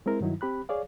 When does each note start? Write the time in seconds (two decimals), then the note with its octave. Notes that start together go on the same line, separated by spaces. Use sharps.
0.06 G#3 C4 E4 A#4
0.21 G2 D#3 F#3 D#4 E4
0.41 C4 G4 B5 F#6
0.69 G#4 C#5 D5 F5